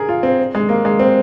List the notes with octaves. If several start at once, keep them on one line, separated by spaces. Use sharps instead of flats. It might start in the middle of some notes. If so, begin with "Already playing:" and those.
Already playing: G#4 A#4
F4
C4
G#3
A#3
G#3
C4